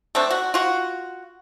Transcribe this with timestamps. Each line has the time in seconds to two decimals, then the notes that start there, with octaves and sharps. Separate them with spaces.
0.15 A3 C4 D4
0.31 F#4
0.54 F4 F#4